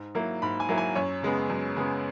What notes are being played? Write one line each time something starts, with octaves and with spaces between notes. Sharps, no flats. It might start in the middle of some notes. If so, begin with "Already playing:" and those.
Already playing: G#2
F#3 A#3 E4
G#2 B5
G#5
F#3 A#3 E4
G#5
F#2 C#5
C#3 G#3 B3
F#2
C#3 G#3 B3